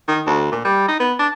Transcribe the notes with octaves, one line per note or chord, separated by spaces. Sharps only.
D#3
D2
A#2
G3
D#4
B3
D4